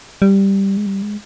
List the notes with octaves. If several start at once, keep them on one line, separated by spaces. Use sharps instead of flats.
G3
G#3
G3
G#3